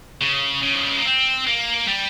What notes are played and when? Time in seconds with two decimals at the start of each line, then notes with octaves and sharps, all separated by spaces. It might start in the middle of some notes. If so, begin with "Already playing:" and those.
0.22 C#3
0.63 C#3
0.75 F3
0.83 G3
0.91 G#3
0.98 A#3
1.05 C4
1.47 A#3
1.88 G3